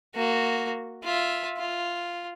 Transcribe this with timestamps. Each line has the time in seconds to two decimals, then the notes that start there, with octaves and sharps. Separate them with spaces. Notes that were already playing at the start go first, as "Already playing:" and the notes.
0.15 A#3 F#4
1.04 F4 E5
1.57 F4